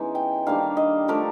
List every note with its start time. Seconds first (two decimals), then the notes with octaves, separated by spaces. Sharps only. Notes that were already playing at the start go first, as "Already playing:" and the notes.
Already playing: E3 G#3 B3 C#4 D#4
0.15 G5
0.46 D#3 G3 A#3 D4 F5
0.77 D#5
1.08 F3 A3 D4 A#4